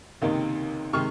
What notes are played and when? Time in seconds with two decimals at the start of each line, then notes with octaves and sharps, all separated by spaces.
0.21 C#2 C3 D#3 A#3 D#4
0.93 C3 D#3 G#3 C#6 F6